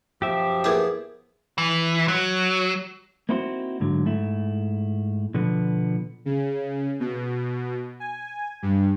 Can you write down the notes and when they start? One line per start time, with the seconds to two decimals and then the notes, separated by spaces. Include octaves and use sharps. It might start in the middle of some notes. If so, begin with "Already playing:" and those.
0.22 F#2 B2 F3 G4 E5
0.64 B3 E4 G#4 A#4 D6
1.58 E3
2.08 F#3
3.29 A#3 C4 D#4 E4 F#4 C5
3.80 G#2 D3 F#3
4.06 G#2 A3 E4
5.34 B2 D3 F3 B3
6.25 C#3
7.00 B2
8.00 G#5
8.62 G2